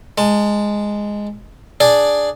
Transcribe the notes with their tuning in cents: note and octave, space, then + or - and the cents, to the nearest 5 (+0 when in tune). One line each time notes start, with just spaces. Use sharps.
G#3 -5 A5 +15
D4 +0 G#4 +0 D5 +0